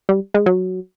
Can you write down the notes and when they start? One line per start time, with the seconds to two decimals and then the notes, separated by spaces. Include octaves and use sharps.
0.09 G3
0.34 G#3
0.46 F#3